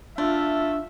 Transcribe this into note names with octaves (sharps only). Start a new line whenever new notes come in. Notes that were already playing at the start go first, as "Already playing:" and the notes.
A3 D4 F4 E5